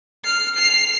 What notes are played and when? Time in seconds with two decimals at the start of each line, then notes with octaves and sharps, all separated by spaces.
0.24 F6 C7
0.55 C7 F7